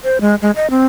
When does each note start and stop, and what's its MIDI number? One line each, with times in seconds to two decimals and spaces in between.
0.04 0.21 72
0.21 0.35 56
0.42 0.51 56
0.56 0.69 75
0.70 0.86 60